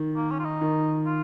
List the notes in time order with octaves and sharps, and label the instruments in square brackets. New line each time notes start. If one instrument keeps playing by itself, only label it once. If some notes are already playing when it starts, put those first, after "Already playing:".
Already playing: [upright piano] D#3
[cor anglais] A#3
C#4
F4
D#4
[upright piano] D#3
[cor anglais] F4